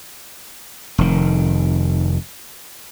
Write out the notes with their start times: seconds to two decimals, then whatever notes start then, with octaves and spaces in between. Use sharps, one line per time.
0.98 F1 D#3